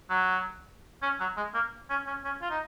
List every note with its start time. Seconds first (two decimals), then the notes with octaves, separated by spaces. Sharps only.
0.10 F#3
1.02 C#4
1.20 F#3
1.37 G#3
1.54 A#3
1.89 C#4
2.06 C#4
2.24 C#4
2.42 F4
2.50 D#4